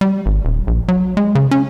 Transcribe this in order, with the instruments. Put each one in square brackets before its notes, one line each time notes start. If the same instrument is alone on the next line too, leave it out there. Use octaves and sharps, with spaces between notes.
[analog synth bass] G3
G#1
D#1
A#1
F#3
G#3
C#3
C#4